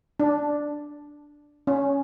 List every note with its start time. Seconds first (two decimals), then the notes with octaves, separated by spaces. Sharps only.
0.20 D4
1.67 C#4